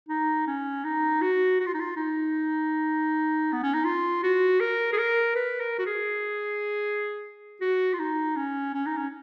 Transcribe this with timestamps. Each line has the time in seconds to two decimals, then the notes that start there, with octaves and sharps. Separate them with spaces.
0.09 D#4
0.47 C#4
0.84 D#4
1.22 F#4
1.60 F#4
1.66 F4
1.74 D#4
1.80 F4
1.96 D#4
3.53 B3
3.63 C#4
3.74 D#4
3.85 F4
4.23 F#4
4.60 A#4
4.93 G#4
4.98 A#4
5.35 B4
5.60 A#4
5.79 F#4
5.86 G#4
7.61 F#4
7.94 F4
7.99 D#4
8.36 C#4
8.74 C#4
8.86 D#4
8.97 C#4